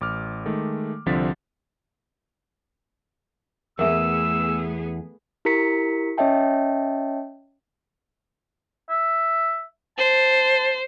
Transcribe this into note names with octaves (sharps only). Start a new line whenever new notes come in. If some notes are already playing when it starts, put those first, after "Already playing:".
A1 D6 F6
D#3 G#3 A3
C2 D3 F3 C4 A6 B6
E2 A3 B3 G#4 A#4 E5 E6
E4 G4 A#4 A#5 B6 C#7
C#4 C#5 D#5 E5 G5 A5
E5
C5 A5